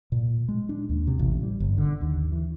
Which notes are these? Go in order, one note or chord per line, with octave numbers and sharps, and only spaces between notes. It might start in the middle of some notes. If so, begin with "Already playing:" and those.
A#2
G#3
D4
D#2
C3
A1
G3
G1
D3
D#2
E3